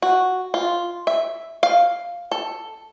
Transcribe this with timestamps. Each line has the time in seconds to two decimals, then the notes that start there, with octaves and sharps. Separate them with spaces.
0.02 F#4
0.54 F4
1.07 E5
1.63 F5
2.32 A4